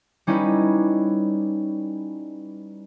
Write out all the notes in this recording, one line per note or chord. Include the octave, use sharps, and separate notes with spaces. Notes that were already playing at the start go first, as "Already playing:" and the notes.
G3 C#4 D#4 E4 B4